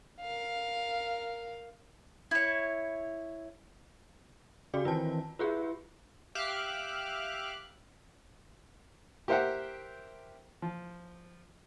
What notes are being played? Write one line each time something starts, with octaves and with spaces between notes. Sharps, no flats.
A#4 F5
E4 C#5
C#3 F#4 G4 D5
D#3 E3 C4 F4 A5
E4 F4 G4 G#4 B4
G4 E5 F5 D6 F6 F#6
G4 A#4 C5 E5 F#5 G5
F3